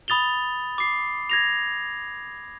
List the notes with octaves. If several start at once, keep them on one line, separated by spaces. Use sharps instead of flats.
B5 D#6 A6 F7 G7
D6 C7
G#6 A#6 F7